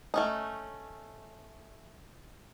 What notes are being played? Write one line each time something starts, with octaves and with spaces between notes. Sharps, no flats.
A3 C#4 D#4